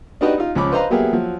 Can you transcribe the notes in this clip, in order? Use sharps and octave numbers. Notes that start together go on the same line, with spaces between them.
D4 D#4 F#4 G4 B4 D#5
D#4 F4
C#2 F3 C#5 B5 D6
B4 C5 D#5 F5 A#5 C6
F#3 A#3 B3 G4 G#4 E5
F3 F#3